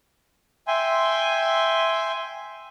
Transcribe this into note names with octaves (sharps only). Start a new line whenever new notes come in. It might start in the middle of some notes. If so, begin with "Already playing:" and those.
E5 G5 G#5 C6